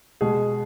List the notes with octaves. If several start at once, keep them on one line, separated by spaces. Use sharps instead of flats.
B2 G#3 G#4